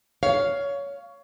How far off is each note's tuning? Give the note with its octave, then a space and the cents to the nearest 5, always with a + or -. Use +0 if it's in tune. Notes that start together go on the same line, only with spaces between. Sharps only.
C#5 +20 F5 +0